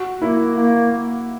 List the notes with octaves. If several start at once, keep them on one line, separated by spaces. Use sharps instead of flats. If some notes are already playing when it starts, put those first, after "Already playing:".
Already playing: F#4
A#3 E4
A#3
A#3